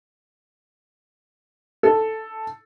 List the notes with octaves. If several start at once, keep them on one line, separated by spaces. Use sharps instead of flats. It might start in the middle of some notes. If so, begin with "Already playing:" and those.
A4